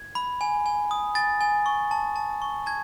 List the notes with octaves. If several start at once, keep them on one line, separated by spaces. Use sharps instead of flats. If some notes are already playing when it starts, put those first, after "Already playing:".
Already playing: G#6
B5
G#5
G#5
D#6
G#5 A6
G#5
C#6
A5
A5
C#6
A5 G#6